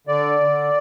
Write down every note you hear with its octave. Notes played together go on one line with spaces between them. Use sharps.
D3 D5
D3